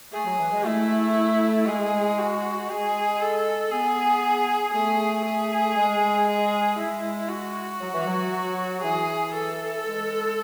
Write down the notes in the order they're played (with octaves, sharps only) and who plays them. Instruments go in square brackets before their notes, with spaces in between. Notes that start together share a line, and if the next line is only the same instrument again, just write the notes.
[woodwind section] A3 [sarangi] G#4
[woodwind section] F#3
E3
G#3
[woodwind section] A3 [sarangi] E4
[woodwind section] G#3 [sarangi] G#4
[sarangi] F#4
[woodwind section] G#3 [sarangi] G#4
[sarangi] A4
[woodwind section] B3 [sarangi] G#4
[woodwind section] A3 [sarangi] G#4
[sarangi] G#4
[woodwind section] G#3
[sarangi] G#4
[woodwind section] G#3 [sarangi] E4
[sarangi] F#4
[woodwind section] F#3
E3
F#3
[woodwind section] E3 [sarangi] G#4
[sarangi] A4
[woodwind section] G#3